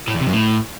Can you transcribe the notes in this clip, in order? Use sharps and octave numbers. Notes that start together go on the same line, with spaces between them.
A2
E2
C3
F#2
A2